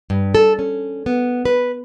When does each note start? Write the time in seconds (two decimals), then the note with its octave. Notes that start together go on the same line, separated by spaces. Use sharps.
0.10 G2
0.35 A4
0.59 C#4
1.06 B3
1.45 B4